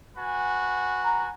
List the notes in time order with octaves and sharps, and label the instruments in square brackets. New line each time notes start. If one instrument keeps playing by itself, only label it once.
[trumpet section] F#4 B4 G#5
[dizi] A#5